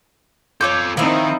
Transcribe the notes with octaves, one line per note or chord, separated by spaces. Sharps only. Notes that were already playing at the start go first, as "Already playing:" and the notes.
F4 A4 C#5 D6 G6
D#3 F3 C4 D#4 E4